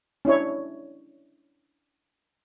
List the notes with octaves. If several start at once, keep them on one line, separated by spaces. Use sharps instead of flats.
C#4 D4 E4 C#5